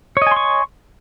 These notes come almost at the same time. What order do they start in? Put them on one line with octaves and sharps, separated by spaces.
C#5 D#5 G#5 C6 C#6